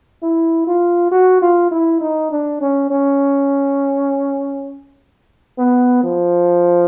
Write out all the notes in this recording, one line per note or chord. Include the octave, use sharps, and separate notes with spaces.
E4
F4
F#4
F4
E4
D#4
D4
C#4
C#4
B3
F3